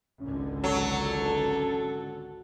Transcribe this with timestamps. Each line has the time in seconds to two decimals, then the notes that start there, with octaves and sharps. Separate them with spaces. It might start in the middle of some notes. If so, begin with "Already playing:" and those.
0.20 G#1 C#2 D3 C#4
0.64 F#3 A4